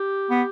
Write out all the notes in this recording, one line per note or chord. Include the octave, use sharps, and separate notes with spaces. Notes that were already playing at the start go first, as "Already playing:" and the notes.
Already playing: G4
B3